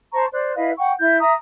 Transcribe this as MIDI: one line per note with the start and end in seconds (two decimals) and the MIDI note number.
0.13 0.25 72
0.13 0.25 81
0.13 0.25 82
0.13 0.25 85
0.31 0.53 72
0.31 0.53 74
0.31 0.53 90
0.55 0.71 64
0.55 0.71 71
0.55 0.71 75
0.55 0.71 77
0.77 0.92 78
0.77 0.92 79
0.77 0.92 85
0.98 1.17 64
0.98 1.17 91
1.19 1.32 76
1.19 1.32 82
1.19 1.32 87